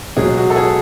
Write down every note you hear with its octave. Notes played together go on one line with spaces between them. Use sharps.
C#2 B2 F#3 G#4
F#4
A4
G#4